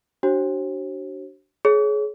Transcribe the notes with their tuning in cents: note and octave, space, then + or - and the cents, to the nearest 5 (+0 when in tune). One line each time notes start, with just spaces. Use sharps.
D4 +0 F#4 +40 C5 +40
G#4 +25 C#5 +0